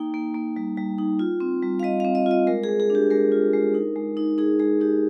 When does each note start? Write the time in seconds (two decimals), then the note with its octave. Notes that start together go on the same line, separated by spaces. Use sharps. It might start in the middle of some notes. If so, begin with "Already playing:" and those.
Already playing: A#3 D#4 G5
0.14 A#3
0.35 A#3
0.56 G3
0.77 G3
0.98 D#4
1.19 F4
1.40 C4
1.63 G3
1.80 F5
1.83 G3 D#5
2.00 C4 F5
2.15 D#5
2.26 F4
2.31 D#5
2.47 G#3 A#4
2.64 G#4
2.69 G#3
2.80 G#4
2.90 D4
2.95 G4
3.11 G#3 A#4
3.32 F4
3.53 G#3
3.74 D#4
3.96 G#3
4.17 D#4
4.38 D#4 G#4
4.60 G#3 G#4
4.81 D#4 G4